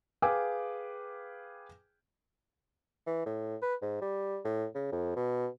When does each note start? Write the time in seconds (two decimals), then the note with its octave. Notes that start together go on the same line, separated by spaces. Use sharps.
0.22 G#4 B4 F5 G5 D6
3.06 E3
3.26 A2
3.62 B4
3.82 G#2
4.01 G3
4.45 A2
4.74 C#3
4.92 F2
5.16 B2